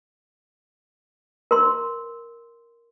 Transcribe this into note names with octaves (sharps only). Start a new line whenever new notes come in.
A#4 C6